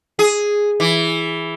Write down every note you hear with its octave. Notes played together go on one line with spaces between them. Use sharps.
G#4
E3